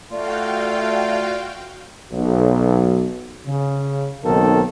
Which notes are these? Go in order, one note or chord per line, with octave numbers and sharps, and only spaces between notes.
A3 F4 F#4 D5 F5 G5
B1
C#3
B1 D#3 A#3 C4 A4